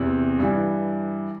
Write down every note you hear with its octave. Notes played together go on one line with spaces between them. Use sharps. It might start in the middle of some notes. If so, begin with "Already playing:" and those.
Already playing: E2 C3 E3
G2 E3